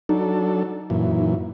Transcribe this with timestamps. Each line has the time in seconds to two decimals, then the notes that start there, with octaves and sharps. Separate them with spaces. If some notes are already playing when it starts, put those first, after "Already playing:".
0.09 F#3 D4 D#4 A4
0.90 F#2 A#2 E3